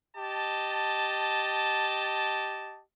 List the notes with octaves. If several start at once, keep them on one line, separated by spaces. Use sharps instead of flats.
G4 D#5 A5